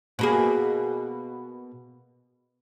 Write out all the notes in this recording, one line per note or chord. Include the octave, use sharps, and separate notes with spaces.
B2 A#3 G#4